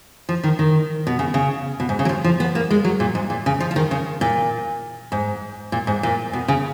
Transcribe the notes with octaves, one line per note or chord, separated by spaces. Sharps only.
F3
D#3
D#3
B2
C#3
C#3
B2
G#2
C#3
F#3
F3
F3
B3
A#3
G#3
F#3
A#2
G#2
A#2
C#3
F3
F3
D#3
C#3
A#2
G#2
A#2
G#2
A#2
B2
C#3